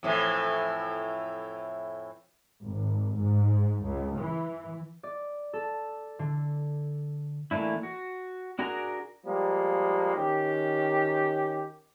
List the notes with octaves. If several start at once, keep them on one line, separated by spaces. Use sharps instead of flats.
F2 A2 E3
G#1
G#2
C#2
E3
D5
A4
D3
E3 A3 A#3 D4 E4
F#4
D4 F#4 G#4 A#4 A#5
F3 G3 G#3 A#3
D#3 C#4 G4